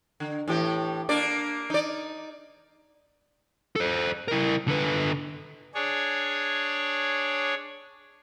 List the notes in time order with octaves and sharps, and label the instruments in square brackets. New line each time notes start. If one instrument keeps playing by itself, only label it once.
[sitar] D3
A2 E3 G4
A#3 D4 D5
D#4 D5
[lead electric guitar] A4 C5
E4 A#4
D3 B4
[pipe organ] D4 G#4 C#5